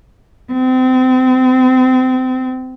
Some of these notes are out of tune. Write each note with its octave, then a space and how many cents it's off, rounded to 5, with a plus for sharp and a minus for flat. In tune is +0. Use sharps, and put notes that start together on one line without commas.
C4 -30